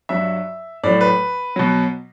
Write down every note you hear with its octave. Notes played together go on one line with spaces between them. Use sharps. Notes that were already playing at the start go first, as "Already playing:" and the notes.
G2 F#3 E5
A2 F#3 D5
B4
B2 F#3